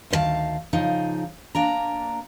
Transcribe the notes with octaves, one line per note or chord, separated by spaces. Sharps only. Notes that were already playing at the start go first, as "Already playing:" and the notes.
D2 D#3 C5 F5 A5
C#3 F3 D#4
A#3 D4 A#5